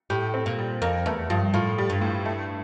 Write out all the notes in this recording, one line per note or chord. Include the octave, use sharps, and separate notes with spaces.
A2 G4
C4
A#2
G3
F2 A#4
E2 A3
G2 F3
A2 F4
G3
G2
A2
A3